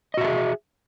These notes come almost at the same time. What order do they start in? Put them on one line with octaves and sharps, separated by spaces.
D#5 F#4 E5 A4 G#4